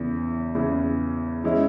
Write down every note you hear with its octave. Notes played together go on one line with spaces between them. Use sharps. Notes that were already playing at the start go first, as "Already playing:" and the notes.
Already playing: E2 C#3 E3
E2 C#3 E3
E3 G#3 C#4 E4